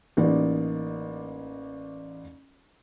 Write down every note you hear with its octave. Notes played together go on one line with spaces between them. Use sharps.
A1 A#3 D#4 D5